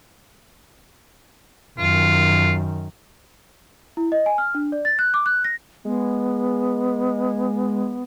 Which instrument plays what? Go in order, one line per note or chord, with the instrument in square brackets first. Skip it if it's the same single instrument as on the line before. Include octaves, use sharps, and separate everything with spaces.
[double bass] F#2 D#3 [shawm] F4
[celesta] E4
D#5
G#5
F6
D4
D5
A6
F#6
D6
F#6
A#6
[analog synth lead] G#3 [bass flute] B3